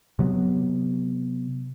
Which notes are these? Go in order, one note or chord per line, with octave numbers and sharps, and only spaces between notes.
C3 F#3 B3